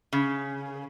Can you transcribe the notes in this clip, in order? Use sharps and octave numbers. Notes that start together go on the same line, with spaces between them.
C#3